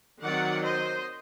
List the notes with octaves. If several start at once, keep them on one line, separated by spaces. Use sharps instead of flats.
D#3 F#3 C4 D5 F#5
C5 D#5